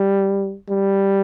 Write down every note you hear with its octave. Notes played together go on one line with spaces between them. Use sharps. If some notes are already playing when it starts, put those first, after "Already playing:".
Already playing: G3
G3